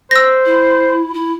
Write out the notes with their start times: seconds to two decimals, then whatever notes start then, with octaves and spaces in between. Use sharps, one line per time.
0.11 C5 E6 A#6
0.46 E4
1.14 E4